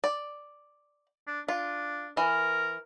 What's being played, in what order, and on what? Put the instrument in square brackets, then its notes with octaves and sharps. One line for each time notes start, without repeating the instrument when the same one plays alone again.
[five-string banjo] D5
[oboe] D4
[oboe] D4 [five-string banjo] F4
[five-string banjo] E3 [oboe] A#4